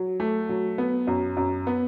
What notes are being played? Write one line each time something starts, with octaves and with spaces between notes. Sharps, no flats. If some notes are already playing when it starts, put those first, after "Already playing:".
Already playing: F#3
A3
F#3
B3
F#2
F#2
B3